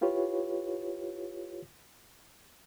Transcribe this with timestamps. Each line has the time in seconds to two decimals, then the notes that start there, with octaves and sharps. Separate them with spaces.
0.01 E4 F4 G4 B4 C#5